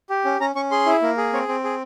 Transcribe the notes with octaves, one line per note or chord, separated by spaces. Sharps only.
G4
C#4
C#4 A#5
C#4 C#6
G#4 C6
E4
A#3
G#4
C4 C#5
C4
G#4